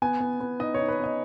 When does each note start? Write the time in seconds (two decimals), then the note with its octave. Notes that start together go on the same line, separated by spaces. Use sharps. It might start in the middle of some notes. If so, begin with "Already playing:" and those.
0.02 B3 G#5
0.20 B3
0.40 B3
0.60 D#4 D#5
0.74 D#4 C#5
0.88 B4
0.99 B3 D#5